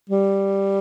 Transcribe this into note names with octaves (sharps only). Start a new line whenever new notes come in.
G3